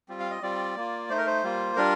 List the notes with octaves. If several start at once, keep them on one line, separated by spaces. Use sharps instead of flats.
G3 C4 F4
F5
D#5
G3 C4 F4 D5
A#3 F4
A3 D#4 C5
A#4
C5
G3 A#3 F4
G3 D4 F4 A#4